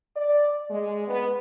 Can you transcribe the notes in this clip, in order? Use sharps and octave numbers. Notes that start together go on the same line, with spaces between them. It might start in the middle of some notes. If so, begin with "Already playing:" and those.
D5
G#3
B3